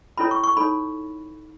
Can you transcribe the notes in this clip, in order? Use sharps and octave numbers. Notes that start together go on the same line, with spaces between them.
C#4 E4 A4 C#5 B5
C#6
C#6
D#4 A4 C#5 B5